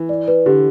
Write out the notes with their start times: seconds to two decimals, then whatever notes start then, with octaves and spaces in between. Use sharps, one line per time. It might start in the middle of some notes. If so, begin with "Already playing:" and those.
Already playing: E3
0.09 D5
0.28 B4
0.46 D3 G4